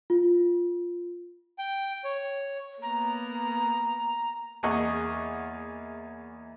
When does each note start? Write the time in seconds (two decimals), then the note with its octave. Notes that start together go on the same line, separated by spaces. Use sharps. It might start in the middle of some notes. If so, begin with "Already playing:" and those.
0.10 F4
1.58 G5
2.04 C#5
2.82 A#3 B3 A#5
4.63 E2 A#3 G#4 D#5 F#5 C#6